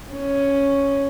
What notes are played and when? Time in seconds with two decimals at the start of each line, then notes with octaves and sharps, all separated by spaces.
0.13 C#4